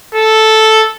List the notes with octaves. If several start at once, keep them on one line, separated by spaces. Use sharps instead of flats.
A4